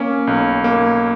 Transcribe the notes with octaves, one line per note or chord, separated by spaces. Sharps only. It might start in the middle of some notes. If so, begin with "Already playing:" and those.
Already playing: A#3 C#4
B1
A#3